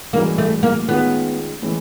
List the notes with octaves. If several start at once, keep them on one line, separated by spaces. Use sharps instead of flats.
G2 E3 G#3 A#3 C#4 F#4
A3
A#3
D#3 G#3 B3 C#4 F4 G#4
A2 E3 G#3